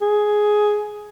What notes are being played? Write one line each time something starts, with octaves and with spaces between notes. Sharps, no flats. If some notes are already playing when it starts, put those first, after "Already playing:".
G#4